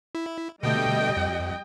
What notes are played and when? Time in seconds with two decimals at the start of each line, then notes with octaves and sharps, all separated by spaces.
0.15 E4
0.63 B2 D3 G3 A3 D#5 G5
1.17 F2